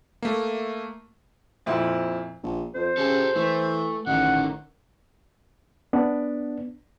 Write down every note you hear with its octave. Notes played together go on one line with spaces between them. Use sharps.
A3 A#3
F2 A#2 C4 E4
A#1
F2 C5
C#3 G4 A4
E3 A3
A1 D3 D#3 F#5
B3 D4